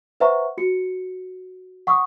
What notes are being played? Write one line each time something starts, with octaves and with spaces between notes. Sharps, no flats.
B4 C5 E5 F#5 A#5 C#6
F#4 C#7
F#5 C#6 D#6 E6